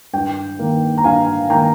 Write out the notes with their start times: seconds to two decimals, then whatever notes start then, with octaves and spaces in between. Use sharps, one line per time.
0.13 G2 G5
0.59 D#3 A#3
0.98 A#5
1.04 G2 F5 G#5
1.50 D#3 A#3 G5 A#5